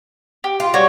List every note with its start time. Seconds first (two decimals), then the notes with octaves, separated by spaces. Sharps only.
0.44 G4
0.60 F4
0.74 G3 F#4 C#5